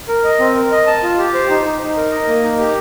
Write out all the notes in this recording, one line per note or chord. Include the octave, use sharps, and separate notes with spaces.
A#4
D#5
C4
A#4
D#5
A5
F4
G4
C5
D#4
D#4
D#4
A#4
D#5
A#3
D#4
G4